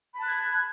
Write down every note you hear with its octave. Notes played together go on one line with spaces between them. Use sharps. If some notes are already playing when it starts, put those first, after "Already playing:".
A5 B5 F#6 G#6